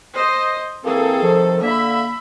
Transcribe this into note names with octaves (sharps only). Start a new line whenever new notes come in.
C5 D#5
E3 A#3 C4 G#4 A4
C3 D#3 F3
D3 A#3 E5 B5